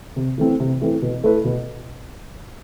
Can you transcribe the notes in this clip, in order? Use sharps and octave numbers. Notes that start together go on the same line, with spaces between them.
C3
E3 A3 C4
C3
E3 A3 C4
B2
A3 E4 B4
B2